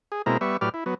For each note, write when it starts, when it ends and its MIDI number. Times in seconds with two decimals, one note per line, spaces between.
0.12 0.22 68
0.26 0.37 47
0.26 0.37 56
0.26 0.37 58
0.26 0.37 60
0.26 0.37 64
0.26 0.37 82
0.41 0.57 55
0.41 0.57 59
0.41 0.57 76
0.41 0.57 85
0.61 0.69 45
0.61 0.69 54
0.61 0.69 67
0.61 0.69 71
0.61 0.69 74
0.61 0.69 89
0.74 0.84 64
0.86 0.94 54
0.86 0.94 59